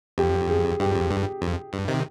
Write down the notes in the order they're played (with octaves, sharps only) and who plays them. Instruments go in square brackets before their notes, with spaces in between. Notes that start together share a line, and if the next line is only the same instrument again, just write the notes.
[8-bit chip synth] F2 [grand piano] G4
[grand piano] G#4
[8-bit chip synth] G2 [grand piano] G4
[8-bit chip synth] F2
G2
F2
G2
C3 D#3